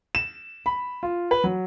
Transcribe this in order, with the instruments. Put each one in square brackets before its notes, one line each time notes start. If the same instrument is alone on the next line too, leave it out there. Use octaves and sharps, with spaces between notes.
[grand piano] E7
B5
F4
B4
F#3